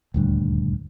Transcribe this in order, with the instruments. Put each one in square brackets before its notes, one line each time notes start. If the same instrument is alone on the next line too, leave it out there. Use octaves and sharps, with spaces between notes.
[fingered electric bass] D#1 D2 G2